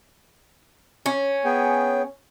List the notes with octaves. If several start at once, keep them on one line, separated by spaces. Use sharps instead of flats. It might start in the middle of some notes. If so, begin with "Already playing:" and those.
C#4
B3 G#4 G5